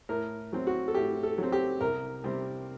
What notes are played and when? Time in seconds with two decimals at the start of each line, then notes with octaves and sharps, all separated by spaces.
0.09 A2 A#4
0.53 F#3 C4
0.67 F#4
0.88 A4
0.95 A2 G4
1.23 A4
1.38 F#3 C4
1.52 G4
1.81 C2 A#4
2.24 C3 G3 C4